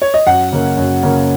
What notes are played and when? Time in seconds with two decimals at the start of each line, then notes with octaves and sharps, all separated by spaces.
0.02 C#5
0.14 D#5
0.27 F#2 F#5
0.53 C#3 A#3 C#4
0.77 F#2
1.03 C#3 A#3 C#4